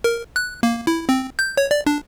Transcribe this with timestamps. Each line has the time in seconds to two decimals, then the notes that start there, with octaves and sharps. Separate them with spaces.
0.04 A#4
0.36 F#6
0.63 A#3
0.87 E4
1.09 C4
1.39 G6
1.57 C#5
1.71 D5
1.87 D4